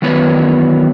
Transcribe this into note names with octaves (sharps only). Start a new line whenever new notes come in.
D#3 E3 F#3 B3 B4 C#5